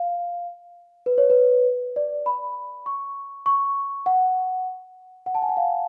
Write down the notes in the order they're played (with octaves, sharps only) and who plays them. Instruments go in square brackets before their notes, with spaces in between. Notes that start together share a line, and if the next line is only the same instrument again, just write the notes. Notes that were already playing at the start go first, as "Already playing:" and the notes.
Already playing: [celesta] F5
B4
C#5
B4
D5
B5
C#6
C#6
F#5
F#5
A5
G#5
F#5
F5